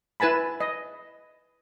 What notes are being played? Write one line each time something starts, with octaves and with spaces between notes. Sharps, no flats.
E4 B4 G#5 A5 B5
D#5